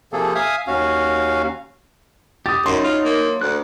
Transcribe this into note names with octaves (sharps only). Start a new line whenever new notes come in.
C3 F3 A#3 G#4 A4
E5 F5 G#5 D#6
D#2 C#4 F#4 F5
G4 D#6 A6
F#2 F#3 D#4 E4 C6
F4
A#3
D2 F#6